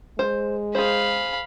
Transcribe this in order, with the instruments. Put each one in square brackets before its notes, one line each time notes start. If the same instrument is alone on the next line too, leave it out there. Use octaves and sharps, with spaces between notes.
[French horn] G#3 [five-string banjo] C5
[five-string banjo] G#4 C5 [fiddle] F5 B5